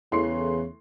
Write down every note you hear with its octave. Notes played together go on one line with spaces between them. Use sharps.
E2 C#3 E3 A3 C6 C7